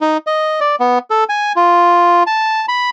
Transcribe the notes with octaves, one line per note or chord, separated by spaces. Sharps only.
D#4
D#5
D5
B3
A4
G#5
F4
A5
B5